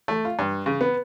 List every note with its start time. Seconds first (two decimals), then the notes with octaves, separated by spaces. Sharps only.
0.08 A3
0.25 F4
0.39 G2
0.66 C#3
0.81 B3